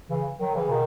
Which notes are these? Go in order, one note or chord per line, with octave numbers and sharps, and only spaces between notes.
C#3 E3
D#3 F#3
C#3 E3
B2 D#3